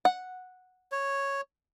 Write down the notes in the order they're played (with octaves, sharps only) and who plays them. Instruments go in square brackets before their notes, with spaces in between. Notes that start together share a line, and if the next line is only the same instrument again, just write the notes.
[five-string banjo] F#5
[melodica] C#5